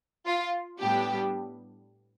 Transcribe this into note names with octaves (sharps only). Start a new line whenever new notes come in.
F4
A2 G3 B3 D4 G4